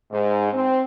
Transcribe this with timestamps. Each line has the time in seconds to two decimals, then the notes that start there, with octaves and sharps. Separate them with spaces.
0.12 G#2
0.53 C4